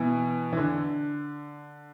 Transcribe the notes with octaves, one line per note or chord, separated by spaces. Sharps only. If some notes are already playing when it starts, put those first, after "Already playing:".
Already playing: B2 E3
E3
D3